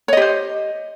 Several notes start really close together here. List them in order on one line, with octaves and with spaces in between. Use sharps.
C#5 D#5 G4 C5